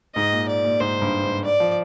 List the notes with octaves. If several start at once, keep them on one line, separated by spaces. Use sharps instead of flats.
G#2 D#5
A#2
D5
A#2
G#2 C5
G2
G#2
D5
F3